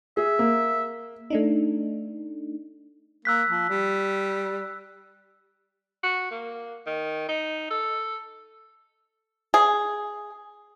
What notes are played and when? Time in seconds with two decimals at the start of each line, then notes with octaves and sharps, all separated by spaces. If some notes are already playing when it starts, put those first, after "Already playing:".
0.17 G#4 E5
0.39 A#3
1.30 A3 D4 D#4
3.25 A#3 E6 F#6 B6
3.49 F3
3.70 G3
6.03 F#4
6.31 A#3
6.87 D#3
7.28 D#4
7.70 A4
9.54 G#4